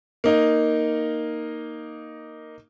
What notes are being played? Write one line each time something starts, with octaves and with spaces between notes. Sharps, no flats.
A#3 D#4